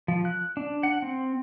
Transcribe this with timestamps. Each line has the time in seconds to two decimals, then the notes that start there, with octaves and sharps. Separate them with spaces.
0.08 F3
0.25 F#6
0.57 D4
0.83 F#5
1.02 C4